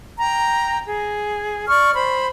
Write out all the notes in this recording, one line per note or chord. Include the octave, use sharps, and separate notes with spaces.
G5 A#5
G#4
D5 C#6 F6
C5 B5